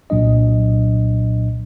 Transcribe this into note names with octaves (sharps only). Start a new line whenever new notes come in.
C2 A#2 F#3 D4 D#5